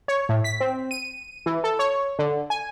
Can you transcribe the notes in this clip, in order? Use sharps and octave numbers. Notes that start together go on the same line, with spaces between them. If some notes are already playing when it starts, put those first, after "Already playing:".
C#5
A2
B6
C4
D#7
E3
A4
C#5
D3
G#5